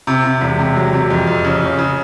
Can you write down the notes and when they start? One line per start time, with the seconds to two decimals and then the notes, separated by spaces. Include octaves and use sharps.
0.07 C3
0.24 C3
0.41 E1
0.59 C3
0.76 F#3
0.93 C3
1.10 F2
1.27 F2
1.44 C#3
1.62 C#3
1.79 C#3